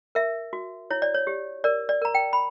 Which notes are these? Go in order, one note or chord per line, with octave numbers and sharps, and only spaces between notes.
A#4 E5
F#4
E4 C#5
D5
C#5
G4
A#4 D5
D5
A#4 A#5
G5
B5